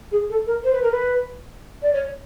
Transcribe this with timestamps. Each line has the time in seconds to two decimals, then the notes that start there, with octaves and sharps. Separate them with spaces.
0.11 G#4
0.29 A4
0.46 A#4
0.64 C5
0.73 B4
0.82 A#4
0.91 B4
1.82 D5
1.93 C#5